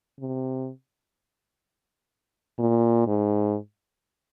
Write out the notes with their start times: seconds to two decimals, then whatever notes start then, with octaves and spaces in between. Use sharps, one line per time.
0.20 C3
2.59 A#2
3.07 G#2